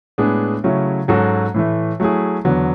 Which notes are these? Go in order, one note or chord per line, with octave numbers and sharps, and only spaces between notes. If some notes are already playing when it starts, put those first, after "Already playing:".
A2 G#3 B3 D4 G#4
C#3 F#3 A3 C#4 E4
G#2 F#3 C#4 F#4 A4
A2 E3 A3
F#3 A3 E4 G#4
E2 D3 F#3 B3